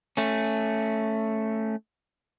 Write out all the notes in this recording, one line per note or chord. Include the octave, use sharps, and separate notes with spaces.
A3 C#4